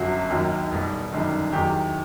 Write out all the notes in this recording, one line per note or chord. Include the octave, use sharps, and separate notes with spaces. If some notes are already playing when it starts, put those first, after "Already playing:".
Already playing: G1 F#2 F#3 F#4
D#2 D#3 F#3
B1 B2 G3
G1 F#2 D#3 G3
E2 D#3 F#3 G4